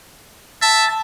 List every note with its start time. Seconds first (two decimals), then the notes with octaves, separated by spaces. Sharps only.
0.62 E5 A5